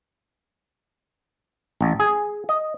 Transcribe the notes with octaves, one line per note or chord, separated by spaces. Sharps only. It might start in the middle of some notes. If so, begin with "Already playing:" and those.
A1
G#4
D#5